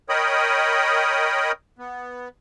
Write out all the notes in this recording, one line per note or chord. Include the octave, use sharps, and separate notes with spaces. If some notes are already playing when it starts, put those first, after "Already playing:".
A#4 C#5 D#5 G5 B5 D#6
B3